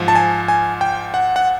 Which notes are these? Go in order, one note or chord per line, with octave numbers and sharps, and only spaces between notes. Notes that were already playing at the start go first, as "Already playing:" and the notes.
Already playing: G#2 F3
A5
G#5
G#5
G5
F#5
F#5